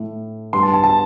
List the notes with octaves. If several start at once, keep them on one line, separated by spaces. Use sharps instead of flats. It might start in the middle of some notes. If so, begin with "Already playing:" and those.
Already playing: A2 A3
G2 G3 C6
A5
A5
A5